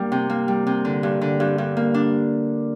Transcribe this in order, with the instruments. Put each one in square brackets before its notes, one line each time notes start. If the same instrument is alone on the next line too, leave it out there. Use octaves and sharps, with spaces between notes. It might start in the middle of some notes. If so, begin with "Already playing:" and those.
Already playing: [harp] G2 G3 A#3
C3
A#3
G3
C3
D3
G2
D3
G2
G2
A#3
D4